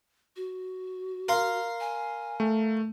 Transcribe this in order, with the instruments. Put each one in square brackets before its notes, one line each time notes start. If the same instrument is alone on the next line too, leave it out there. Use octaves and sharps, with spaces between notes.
[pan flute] F#4
[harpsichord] A#4 F5 C6
[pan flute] G#5
[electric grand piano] A3